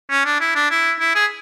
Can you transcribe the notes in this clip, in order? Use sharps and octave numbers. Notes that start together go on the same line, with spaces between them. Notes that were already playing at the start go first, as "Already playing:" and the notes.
C#4
D4
E4
D4
E4
E4
G#4